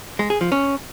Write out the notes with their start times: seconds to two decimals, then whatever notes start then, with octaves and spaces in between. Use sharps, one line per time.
0.19 G#3
0.30 G#4
0.41 F3
0.52 C#4